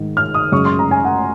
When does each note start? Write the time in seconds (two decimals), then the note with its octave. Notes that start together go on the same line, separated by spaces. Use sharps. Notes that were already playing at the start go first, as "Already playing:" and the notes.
Already playing: G#2 D#3 G#3
0.17 F6
0.34 D#6
0.52 F#2 C#3 G#3 C#6
0.65 C6
0.79 A#5
0.91 G#5
1.05 F#5